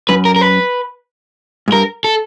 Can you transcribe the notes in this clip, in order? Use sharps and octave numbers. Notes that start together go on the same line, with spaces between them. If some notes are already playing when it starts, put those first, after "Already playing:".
F#2 B4
A#4
A#4
B4
G#2
G2 A#4
A4